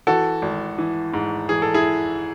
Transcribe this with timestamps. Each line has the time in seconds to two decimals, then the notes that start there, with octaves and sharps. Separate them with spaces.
0.07 E3 F#4 A4
0.42 G#1
0.78 E3
1.14 G#2
1.49 E3 G#4
1.62 A4
1.74 E4 G#4